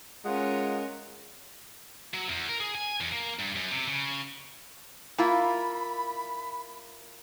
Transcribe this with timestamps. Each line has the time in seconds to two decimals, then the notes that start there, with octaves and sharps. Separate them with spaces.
0.25 G#3 C#4 F4 A#4 D#5 F#5
2.14 F#3
2.29 E2
2.49 A#4
2.60 G#4
2.75 G#5
3.01 E2
3.13 A#3
3.39 G2
3.56 F#2
3.72 C3
3.88 C#3
5.18 A#3 E4 F4 B5